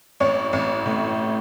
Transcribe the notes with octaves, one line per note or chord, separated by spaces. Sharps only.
A1 C#5
A1
A2